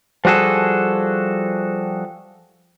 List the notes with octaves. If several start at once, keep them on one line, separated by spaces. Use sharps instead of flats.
F3 G3 F#4 G#4 A4